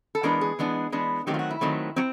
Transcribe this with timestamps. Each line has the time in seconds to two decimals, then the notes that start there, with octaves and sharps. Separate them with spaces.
0.15 A4
0.23 E3 G#3 B3 D4 A#4
0.41 G#4
0.59 E3 G#3 B3 D4
0.92 E3 G#3 B3 D4
1.27 D#3 F#3 A3 C4 G4
1.34 F4
1.39 F#4
1.50 E4
1.61 D#3 F#3 A3 C4
1.96 F#3 C4